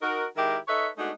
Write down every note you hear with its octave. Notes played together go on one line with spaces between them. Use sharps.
D#4 F#4 A#4
D#3 G#3 E4 G4 A#4
D#4 A4 B4 C#5 D#5 E5
G#3 A3 B3 D4 D#4 F#4